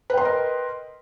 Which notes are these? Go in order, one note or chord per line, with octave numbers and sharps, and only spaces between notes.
A#4 B4 D#5 G5 C6